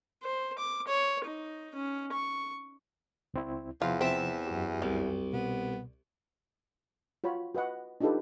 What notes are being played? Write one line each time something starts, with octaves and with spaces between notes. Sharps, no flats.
C5
D6
C#5
D#4
C#4
C#6
C#2 C4 E4
E2 C3 F3 F4
C4 E5 A5
F#2 F#4 G4
C2 G3
B2 B3
F4 F#4 C#5 B5
F#4 B4 D#5 F#5
D4 D#4 F4 G4 A4 B4